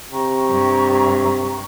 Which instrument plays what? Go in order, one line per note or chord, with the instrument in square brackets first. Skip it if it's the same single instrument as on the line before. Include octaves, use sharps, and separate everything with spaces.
[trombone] C3 [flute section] G5 A#5 C#6
[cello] G2